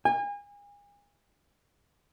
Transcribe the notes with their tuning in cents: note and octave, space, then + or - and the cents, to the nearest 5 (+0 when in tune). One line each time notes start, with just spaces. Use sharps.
G#5 -35